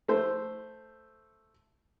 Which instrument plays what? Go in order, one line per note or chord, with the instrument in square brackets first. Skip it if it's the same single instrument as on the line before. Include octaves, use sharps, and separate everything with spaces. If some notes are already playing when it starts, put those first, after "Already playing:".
[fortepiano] A3 C5